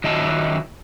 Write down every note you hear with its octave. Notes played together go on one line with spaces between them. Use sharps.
D#3 F#3 D#5 E5 A5